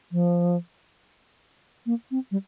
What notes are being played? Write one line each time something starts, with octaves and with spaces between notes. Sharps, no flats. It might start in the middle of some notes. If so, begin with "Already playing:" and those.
F3
A#3
C4
G3